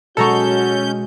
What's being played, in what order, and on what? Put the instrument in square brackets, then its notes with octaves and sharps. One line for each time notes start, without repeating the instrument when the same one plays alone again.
[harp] B2 G#3 [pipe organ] C#4 G6 [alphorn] F#4 [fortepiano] A4 A#5 C#6